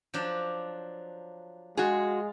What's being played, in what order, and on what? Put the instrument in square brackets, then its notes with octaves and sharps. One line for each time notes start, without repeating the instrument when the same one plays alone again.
[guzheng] F3 F#3 D4
[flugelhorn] G#3 [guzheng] F4 [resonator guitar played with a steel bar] F#4 G#4